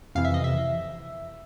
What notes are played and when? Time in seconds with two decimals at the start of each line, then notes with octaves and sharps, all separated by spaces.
0.15 F2 C3 E3 F5
0.25 E5
0.34 D#5
0.44 E5